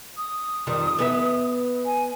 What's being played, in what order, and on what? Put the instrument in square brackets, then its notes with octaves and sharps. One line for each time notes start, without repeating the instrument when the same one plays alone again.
[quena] D#6
[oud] F2 D#3 G3
B3 A4 E5
[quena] G#5